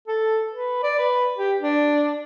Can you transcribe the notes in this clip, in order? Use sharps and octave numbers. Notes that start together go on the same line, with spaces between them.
A4
B4
D5
B4
G4
D4